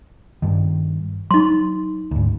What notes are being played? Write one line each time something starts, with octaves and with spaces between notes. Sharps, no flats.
G2 D#3
F#3 D#4 C6
D2 G#2